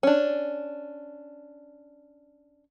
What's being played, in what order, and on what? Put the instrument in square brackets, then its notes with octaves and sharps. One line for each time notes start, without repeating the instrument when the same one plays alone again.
[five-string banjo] C#4 D4